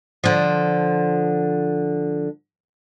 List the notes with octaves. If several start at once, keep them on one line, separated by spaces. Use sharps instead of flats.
D3 F3